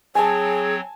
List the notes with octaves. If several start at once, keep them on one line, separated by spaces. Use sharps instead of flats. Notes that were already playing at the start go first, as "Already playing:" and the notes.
F#3 C4 G#4 C#5 G#5 A5